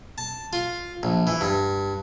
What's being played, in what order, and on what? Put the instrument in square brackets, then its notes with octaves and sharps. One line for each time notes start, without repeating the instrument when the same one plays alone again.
[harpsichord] A5
F4
A#1
E3
G2